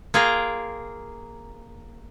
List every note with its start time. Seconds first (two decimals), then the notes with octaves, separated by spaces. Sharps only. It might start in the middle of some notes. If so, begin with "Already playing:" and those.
0.14 A#3 F4 G#4 A#4 G5 A#5